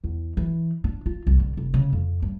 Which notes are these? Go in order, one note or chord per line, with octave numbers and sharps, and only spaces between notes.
E2
E3
D4
F4
C2
D3
F1
C#3
F2
G2